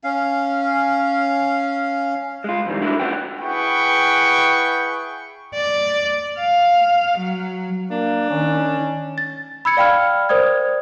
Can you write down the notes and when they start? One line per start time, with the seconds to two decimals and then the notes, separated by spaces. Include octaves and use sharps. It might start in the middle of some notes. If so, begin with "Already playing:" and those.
0.04 C#4 F5
2.44 G#3 F4
2.66 F2 G#2 D#3 E3 G3
2.81 D4 E4 F#4 A#4
3.00 C#4 F4 B4 F#5 G5
3.40 E4 G#4 B4 F#5 G5 C#6
5.55 D5
6.39 F5
7.18 F#3
7.91 A#3 D4
8.30 D#3 C#4
9.18 A6
9.65 B5 E6 G#6 C#7
9.77 D5 F5 G5 B5 F6
10.29 A#4 C5 D5 D#6 G#6